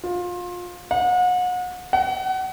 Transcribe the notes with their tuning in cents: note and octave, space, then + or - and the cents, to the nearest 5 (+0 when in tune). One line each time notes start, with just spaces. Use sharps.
F4 +25
F#5 -35
F#5 +30